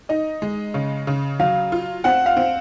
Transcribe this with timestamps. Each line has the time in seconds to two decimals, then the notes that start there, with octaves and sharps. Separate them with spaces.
0.09 D#4 D#5
0.42 G#3
0.74 C#3
1.07 C#3
1.40 F#3 F5
1.72 F4
2.04 C4 F#5
2.26 F5
2.37 C4